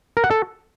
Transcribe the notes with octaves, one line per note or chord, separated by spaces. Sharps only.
A#4
F#5
A4